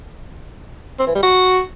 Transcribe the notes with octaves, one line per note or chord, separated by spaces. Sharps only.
C4
E3
G3
F#4